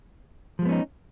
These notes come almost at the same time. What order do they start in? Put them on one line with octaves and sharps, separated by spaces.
F3 G#3 B3 C#4 D#4